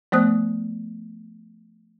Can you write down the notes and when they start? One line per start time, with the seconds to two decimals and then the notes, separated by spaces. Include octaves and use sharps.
0.12 F3 A3 B3 C5 D#6 F#6